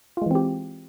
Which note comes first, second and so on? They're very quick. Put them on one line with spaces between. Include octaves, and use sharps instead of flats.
F4 G#3 E3 C4 G4